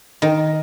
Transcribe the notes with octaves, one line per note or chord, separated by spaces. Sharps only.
D#3